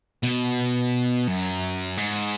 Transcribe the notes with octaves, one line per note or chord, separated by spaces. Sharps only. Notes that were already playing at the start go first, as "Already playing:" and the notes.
B2
F#2
G#2